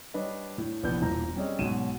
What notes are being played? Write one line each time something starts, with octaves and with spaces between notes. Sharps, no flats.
G3 D4 B4 C#5 D#5
A2
A#1 C3 E3 B3 D5 G6
E1 G2 A#2 E3 A#5 G6
G3 C4 C#4 G#4 D5 D#5
B1 G#2 B2 C#5 D#7 E7